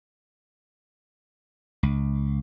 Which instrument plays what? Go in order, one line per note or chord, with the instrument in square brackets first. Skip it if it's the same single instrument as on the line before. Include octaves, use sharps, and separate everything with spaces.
[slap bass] C#2